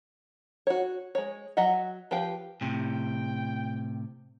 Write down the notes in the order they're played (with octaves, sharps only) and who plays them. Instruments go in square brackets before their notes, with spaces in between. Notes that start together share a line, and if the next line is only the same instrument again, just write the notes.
[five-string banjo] F#4 C#5
G#3 C#5
F#3 D#5 E5 F#5
F3 G4 B4 F5 G5
[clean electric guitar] A2 C3 [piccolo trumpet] G5